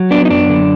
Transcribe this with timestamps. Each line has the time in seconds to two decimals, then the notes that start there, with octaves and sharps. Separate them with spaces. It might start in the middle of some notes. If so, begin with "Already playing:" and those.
Already playing: F#3
0.11 B3 D4
0.25 D#4
0.30 F#2 D4
0.50 D3